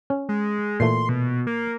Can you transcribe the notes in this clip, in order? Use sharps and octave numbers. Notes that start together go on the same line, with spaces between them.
C#4
G#3
A#2 E3 A3 C6
B2
A#3